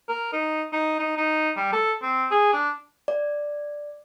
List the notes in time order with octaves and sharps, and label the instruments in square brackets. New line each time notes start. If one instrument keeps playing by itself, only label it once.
[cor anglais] A#4
D#4
D#4
D#4
D#4
G3
A4
C4
G#4
D4
[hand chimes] D5